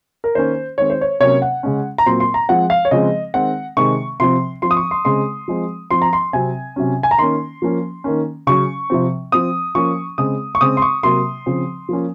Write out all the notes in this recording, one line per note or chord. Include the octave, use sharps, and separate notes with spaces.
A#4
D#3 A#3 C#4 C5
D#3 G#3 C4 C#5
C5
C#5
C3 F#3 A#3 C#4 C#5
F#5
C#3 G#3 C#4
A#5
A#2 F#3 C4 C6
C6
A#5
F3 G#3 C4 F#5
F5
C#5
C#3 F3 G#3 C4 D#5
D#3 G#3 C4 F#5
C3 D#3 G#3 C4 C#6
C3 F3 C4 C6
F3 C4 C6
D#6
C#6
C6
C#3 G#3 C4 C6
F3 G#3 C4
F3 C4 C6
A#5
C6
C3 F#3 C4 G#5
C3 F#3 C#4
G#5
A#5
D#3 A#3 C#4 C6
F3 A#3 C#4
D#3 A#3 C#4
C#3 F#3 C#4 C#6
C3 F3 C4
F3 C4 D#6
F3 A#3 C#4 C#6
C#3 G#3 C4 D#6
C#6
C#3 G#3 C4 D#6
C6
C#6
C3 F#3 A#3 C6
C#3 F3 C4
F3 A#3 C#4